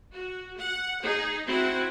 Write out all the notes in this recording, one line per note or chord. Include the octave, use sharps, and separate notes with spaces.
F#4
F#5
D#4 G#4
C4 E4 F#4 F#5